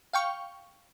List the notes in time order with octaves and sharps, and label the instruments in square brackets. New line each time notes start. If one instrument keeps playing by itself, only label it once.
[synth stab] F5 G5 C#6